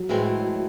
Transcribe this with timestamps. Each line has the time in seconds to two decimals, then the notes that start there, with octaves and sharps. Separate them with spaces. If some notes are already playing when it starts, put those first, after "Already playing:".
Already playing: F#3
0.09 A2 E3 G#3 C4